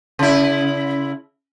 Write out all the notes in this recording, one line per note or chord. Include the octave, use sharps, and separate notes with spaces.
C#3 E4